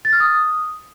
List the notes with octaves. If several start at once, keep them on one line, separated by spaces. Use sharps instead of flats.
A6
F6
D#6